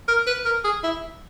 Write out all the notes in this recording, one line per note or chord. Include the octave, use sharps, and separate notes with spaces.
A#4
B4
A#4
G#4
E4